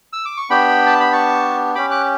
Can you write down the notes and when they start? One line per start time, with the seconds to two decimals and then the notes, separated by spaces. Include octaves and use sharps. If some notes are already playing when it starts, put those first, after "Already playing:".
0.13 E6
0.25 D6
0.37 C#6
0.50 B3 D4 G4 G5 B5
0.86 A5
1.00 B5
1.12 A5 C#6
1.75 C#4 G4 B5 D6
1.91 D6 F#6